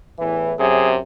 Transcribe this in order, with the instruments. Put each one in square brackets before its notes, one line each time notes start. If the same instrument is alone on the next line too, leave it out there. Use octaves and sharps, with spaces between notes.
[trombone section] E2 A2 E3
[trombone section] F#2 [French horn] C3 [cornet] G#4